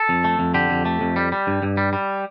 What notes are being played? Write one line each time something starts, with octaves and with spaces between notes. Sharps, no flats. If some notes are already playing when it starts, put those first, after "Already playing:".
Already playing: A4
F2
A3
F2
D3 G4
F2
A3
F2
G3
G3
G2
G2
G3
G3